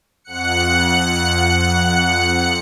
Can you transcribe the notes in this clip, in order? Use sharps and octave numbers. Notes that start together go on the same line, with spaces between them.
F2 F#5 F#6 C#7